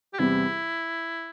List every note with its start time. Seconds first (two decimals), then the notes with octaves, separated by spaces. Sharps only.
0.13 G4
0.19 E2 C3 G3 C4 E4